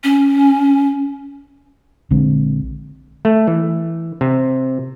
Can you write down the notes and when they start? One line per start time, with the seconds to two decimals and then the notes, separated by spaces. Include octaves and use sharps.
0.04 C#4
2.10 A#1 D3 G#3 C4
3.25 A3
3.48 E3
4.21 C3